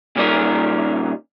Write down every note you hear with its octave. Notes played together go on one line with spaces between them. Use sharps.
A#2 C#3 G3 C#4 D#4 A#4